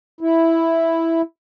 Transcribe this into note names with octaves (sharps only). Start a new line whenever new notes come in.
E4